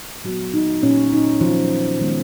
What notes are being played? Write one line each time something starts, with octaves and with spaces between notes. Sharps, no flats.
A#2 F#3 G#3 B3 F#4
D#4
A#2 F3 A#3 C#4
D#4
D#3 F3 F#3 B3 F4
D#3 G#3 B3